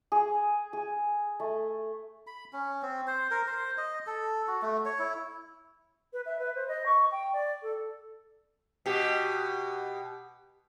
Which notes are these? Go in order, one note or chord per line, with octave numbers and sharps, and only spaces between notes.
G#4
G#4
A3
B5
C#4
C4
C5
A#4
C5
D#5
A4
F#4
A3
C#5
E4
B4
E5
B4
C5
D#5
C#6
G5
D5
A4
B2 G4